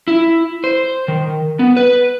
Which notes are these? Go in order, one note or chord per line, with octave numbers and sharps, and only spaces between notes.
E4
C5
D#3
B3
B4